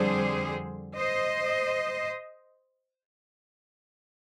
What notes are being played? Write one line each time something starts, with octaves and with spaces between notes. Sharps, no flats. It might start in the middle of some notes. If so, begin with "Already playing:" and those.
Already playing: F2 D3 G3 G#4 C5
C5 D#5